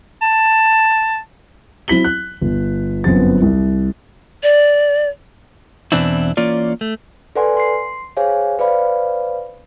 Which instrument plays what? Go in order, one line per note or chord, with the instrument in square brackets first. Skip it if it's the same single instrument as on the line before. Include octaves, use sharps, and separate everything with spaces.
[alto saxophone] A5
[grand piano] F#3 C4 E4 B6 F#7 G7
F#6
G1
G1 F#2 B3 C4 A6
C2
[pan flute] D5
[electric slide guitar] E2 B2 E3 C4 D4 E4
E3 A#3 C#4 F4 D5
A3
[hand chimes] A4 B4 D5 F#5 G#5 C6
C6 C7
G#4 C5 C#5 F5 G#5
B4 C5 D5 F5 B5